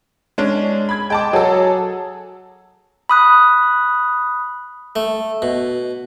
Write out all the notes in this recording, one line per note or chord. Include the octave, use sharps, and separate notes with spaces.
G#3 C#4 D4
B5 G#6
G#3 G5 A5 D6
F#3 G#4 A4
B5 D#6 F#6
A3
B2